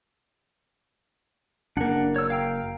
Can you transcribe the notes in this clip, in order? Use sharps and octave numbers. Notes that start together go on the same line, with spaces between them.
F#1 A#3 D4 F#5
C#5 E6
F5 G5 A#5